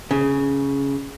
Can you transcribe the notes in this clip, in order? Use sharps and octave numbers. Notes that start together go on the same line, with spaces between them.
C#3